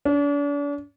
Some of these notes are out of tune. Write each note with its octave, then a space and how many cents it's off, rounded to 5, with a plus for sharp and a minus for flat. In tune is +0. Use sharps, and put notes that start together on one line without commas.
D4 -40